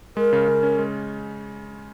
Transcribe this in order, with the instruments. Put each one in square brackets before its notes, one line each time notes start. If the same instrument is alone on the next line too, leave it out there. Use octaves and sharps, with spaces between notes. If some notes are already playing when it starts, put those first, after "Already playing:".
[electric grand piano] G#3 [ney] A#4
[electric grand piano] C#3
C#3
C#4
G#3